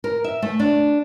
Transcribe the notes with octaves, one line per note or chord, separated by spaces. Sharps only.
A#4
E5
A3
D4